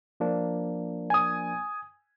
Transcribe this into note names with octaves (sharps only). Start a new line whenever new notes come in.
F3 A#3 D4
G#5 D#6